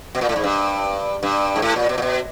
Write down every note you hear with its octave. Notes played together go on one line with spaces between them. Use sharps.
B2
A#2
A2
G#2
G2
G2
G#2
A2
A#2
B2
A#2
B2